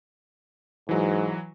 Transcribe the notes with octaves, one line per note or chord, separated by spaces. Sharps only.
G#2 E3 F#3